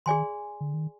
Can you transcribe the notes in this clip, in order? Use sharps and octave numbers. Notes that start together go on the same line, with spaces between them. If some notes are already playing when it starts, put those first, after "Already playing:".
D#3 G#4 D5 G#5 C6
D3
D#3